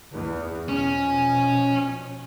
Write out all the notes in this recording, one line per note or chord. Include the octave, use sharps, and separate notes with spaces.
E2
B2 F3 C#4